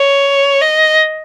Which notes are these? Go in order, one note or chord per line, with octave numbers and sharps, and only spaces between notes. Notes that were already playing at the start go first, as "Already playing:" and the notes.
Already playing: C#5
D#5